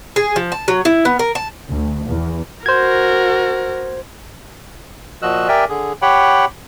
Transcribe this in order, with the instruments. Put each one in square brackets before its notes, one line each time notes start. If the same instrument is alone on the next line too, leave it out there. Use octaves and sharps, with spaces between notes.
[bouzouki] G#4
F3
A5
F#3
E4
B3
A#4
A5
[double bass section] D2
E2
[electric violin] F#4 A#4 [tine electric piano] C5 G#6
[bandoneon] A#2 F3 F#4 D#5 E6 F#6
G4 A#4 D5 E5 G5 G#5
D3 G#4
G4 C#5 F#5 G5 B5